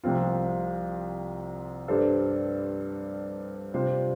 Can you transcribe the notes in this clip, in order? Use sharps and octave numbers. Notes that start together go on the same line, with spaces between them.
C2 C3 F3 C4 F4
G2 G3 D4 A4 C5
C3 G3 F4 C5